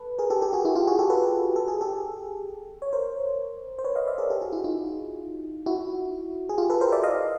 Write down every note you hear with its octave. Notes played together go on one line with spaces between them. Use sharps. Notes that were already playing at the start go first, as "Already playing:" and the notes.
Already playing: A4 B4
G#4 A#4
G4 A4
G4 A4
F#4 G#4
E4 F#4
F4 G4
F#4 G#4
G4 A4
A4 B4
A4
G#4
G4 A4
C#5
A#4 C5
C5
B4 C#5
D#5 F5
D5 E5
G#4 A#4
G4 A4
F#4 G#4
E4 F#4
D#4 F4
E4 F#4
G#4
F4 G4
A4 B4
A#4 C5
D5 E5
D#5 F5